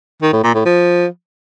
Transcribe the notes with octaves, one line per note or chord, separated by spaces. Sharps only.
D#3
A2
A#2
A2
F3